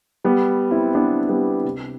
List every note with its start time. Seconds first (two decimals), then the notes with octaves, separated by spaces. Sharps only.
0.24 G3 B3
0.71 C4 E4
0.95 B3 D4
1.29 G3 B3
1.64 C3